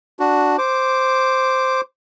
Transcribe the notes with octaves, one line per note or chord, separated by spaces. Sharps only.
D4 F#4
C5 D6